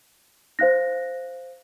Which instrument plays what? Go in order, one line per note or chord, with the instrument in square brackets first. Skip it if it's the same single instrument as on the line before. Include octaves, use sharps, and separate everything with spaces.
[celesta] C5 F5 F#6 A#6